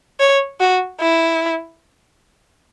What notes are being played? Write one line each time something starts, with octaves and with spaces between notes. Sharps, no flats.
C#5
F#4
E4